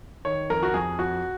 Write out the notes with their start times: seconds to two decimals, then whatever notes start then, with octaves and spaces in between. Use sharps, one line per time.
0.25 D#3 C#5
0.50 F2 A#4
0.63 F#4
0.74 F2 G#4
0.98 F2 F#4